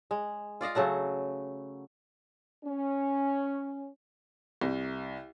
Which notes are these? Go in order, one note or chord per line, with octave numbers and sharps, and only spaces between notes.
G#3
F4 D5 D#5 F5
C#3 F#3 A3 F#5
C#4
C2